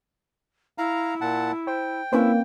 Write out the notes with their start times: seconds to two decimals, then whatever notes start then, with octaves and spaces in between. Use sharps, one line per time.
0.78 E4 F5 A#5
1.21 A#2 F#5 A5
1.67 C5 G5
2.13 A#3 C4 C#4 E4 B4